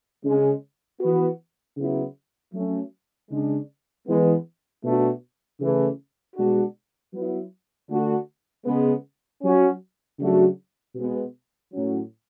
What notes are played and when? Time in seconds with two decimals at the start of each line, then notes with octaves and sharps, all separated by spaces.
0.23 C#3 G#3 C#4
1.01 E3 B3 F#4
1.77 C#3 F#3 B3 E4
2.53 F#3 A3 C#4
3.30 C#3 G#3 D4
4.07 E3 G#3 B3
4.84 B2 A3 D4 F#4
5.60 C#3 E3 A3
6.36 B2 G#3 D4 F#4
7.13 F#3 B3 E4
7.89 D3 A3 D4 F#4
8.65 C#3 G#3 B3
9.43 F#3 C#4 F#4
10.19 C#3 F#3 A3 D4 F#4
10.95 B2 G#3 B3
11.72 A2 F#3 C#4